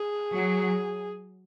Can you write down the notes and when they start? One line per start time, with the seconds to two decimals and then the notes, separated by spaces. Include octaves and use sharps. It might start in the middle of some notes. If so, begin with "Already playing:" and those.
Already playing: G#4
0.34 F#3